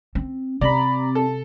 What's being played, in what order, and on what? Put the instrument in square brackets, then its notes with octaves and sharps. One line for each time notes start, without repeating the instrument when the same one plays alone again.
[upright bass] C4
[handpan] C3 [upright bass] C4 [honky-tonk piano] D5 F#7 [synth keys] A#5 B5
[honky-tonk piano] A4